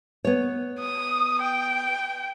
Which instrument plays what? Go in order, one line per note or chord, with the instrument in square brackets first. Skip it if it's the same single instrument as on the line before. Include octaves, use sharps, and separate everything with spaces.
[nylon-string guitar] B3 C#5
[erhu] D#6
G5